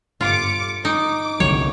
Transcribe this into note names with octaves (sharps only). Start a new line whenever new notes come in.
G1 F4 D6 C#7
D#4 D6
C2 D3 F#3 C#5